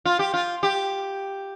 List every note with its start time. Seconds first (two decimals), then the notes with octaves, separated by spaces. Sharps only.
0.05 F4
0.19 G4
0.34 F4
0.63 G4